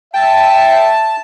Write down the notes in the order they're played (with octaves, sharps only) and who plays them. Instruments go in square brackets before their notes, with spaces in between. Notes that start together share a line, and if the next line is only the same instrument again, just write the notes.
[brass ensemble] E5 [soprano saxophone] G5 [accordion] A5